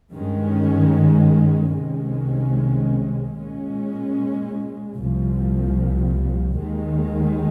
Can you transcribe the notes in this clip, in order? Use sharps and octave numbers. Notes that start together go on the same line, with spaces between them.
G2 D#3 G#3 C#4
C2 C3 D#3 G#3 C#4
A#2 G#3 C#4
C2 A#2 F3
D#2 D#3 G#3